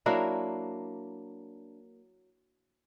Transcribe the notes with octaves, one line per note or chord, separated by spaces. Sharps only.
F#3 A#3 D4 E4